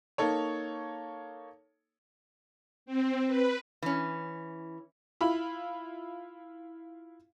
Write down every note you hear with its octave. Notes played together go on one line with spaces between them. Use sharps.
A#3 D#4 A4 C#5
C4
B4
E3 C#4
E4 F4 B5